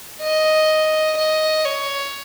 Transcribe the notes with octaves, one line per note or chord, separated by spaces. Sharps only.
D#5
D#5
C#5